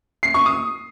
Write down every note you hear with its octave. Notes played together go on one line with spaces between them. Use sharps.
C7
C#6
D#6